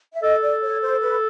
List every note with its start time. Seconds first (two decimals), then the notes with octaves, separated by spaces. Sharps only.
0.13 E5
0.22 A4 D#5
0.42 D5
0.62 C#5
0.82 C5
1.01 B4